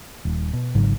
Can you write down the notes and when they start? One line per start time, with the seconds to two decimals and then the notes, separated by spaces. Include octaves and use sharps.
0.25 D#1
0.53 B2
0.75 G#1 G#2 C#3 F#3